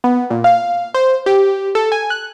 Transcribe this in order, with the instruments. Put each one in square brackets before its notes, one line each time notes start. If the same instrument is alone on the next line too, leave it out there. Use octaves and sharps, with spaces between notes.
[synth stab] B3
A#2
F5
C5
G4
A4
G#5
F#6